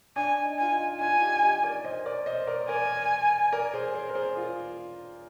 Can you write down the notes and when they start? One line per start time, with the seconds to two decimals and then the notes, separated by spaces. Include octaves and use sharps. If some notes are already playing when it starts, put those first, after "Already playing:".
0.16 D4 G#5
0.44 D#4
0.58 F4 G#5
0.72 D#4
0.91 D#4
1.00 D4 F4 G#5
1.21 D#4 G4
1.42 D#4 G4
1.63 A#4 D5
1.84 C5 D#5
2.05 A#4 D5
2.26 C5 D#5
2.47 A#4 D5
2.68 A#4 D5 G#5
3.52 A#4 D5
3.74 G#4 C5
3.95 G#4 C5
4.09 A#4
4.15 G#4 C5
4.36 F4 G#4